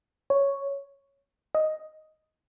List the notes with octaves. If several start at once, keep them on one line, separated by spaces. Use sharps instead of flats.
C#5
D#5